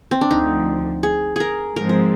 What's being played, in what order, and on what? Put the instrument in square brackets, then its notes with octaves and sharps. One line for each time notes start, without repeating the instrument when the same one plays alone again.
[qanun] C4
D4
[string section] D2 D3 F3 [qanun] D#4
[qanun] G#4
G#4 A#4
[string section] G#2 F3 G#3 C4 [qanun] A#4
[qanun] A#4